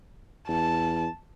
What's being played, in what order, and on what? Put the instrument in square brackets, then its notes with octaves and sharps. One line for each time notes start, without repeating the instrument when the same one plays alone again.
[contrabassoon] E2 [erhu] A5